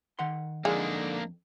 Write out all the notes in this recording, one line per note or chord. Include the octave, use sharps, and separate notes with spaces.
D#3 F#5 C6
F2 D3 G#3 A#3 D4 D#4 F4